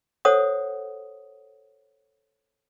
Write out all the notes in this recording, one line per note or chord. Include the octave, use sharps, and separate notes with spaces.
A4 C5 C#5 F#5 D#6